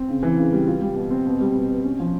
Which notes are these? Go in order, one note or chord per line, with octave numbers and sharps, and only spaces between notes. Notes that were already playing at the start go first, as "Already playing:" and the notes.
Already playing: C4
C#3
E3
C#3
G3
F4
G3
B2
C4
B2
G3
B2
B3
C#4
F3